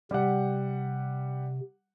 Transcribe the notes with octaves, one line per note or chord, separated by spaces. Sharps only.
C3 G3 G4 F#5